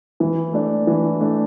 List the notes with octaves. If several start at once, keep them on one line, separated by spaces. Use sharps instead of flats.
E3
A3 D4
E3
A3 D4